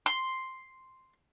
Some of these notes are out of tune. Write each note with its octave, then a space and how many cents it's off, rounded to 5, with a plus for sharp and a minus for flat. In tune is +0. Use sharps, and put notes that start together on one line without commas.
C6 +0